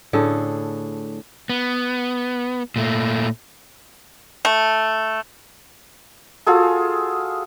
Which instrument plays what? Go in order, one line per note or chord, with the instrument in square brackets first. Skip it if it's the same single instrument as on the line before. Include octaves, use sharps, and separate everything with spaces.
[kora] A2 D3 G#4 A4
[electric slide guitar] B3
A#2 A3
[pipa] A3
[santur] F4 F#4 G#4 A4